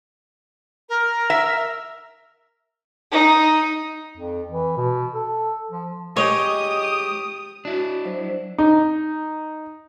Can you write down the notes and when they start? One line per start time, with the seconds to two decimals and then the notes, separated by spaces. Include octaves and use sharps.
0.89 A#4
1.30 E5
3.11 D#4
4.17 F2
4.51 E3
4.77 B2
5.14 A4
5.71 F3
6.16 G#3 G4 C#5 D#5 D#6
7.65 D4 E4 F#4
8.05 F#3 C5
8.58 D#4